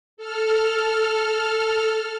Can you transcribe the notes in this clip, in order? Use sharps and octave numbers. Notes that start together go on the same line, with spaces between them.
A4 F6